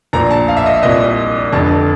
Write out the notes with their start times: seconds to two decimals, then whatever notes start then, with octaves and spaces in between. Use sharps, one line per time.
0.13 A#1 A#2 A#5
0.31 A5
0.48 F5
0.57 E5
0.66 D#5
0.83 C2 A#2 D#5
1.52 F1 F2 D3 A5